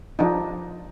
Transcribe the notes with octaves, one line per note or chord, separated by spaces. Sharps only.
F3 D4 D#4